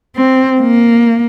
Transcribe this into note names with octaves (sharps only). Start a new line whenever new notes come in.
C4
A#3